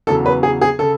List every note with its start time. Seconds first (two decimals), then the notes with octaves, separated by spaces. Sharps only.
0.07 E2 C#3 F#3 A4
0.26 B4
0.43 G#4
0.61 G#4
0.79 C#3 A4